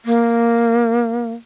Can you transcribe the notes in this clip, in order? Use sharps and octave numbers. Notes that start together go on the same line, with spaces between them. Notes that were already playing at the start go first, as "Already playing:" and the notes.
A#3